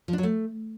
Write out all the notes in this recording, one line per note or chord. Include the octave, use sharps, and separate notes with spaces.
F3
D4
F#3
A3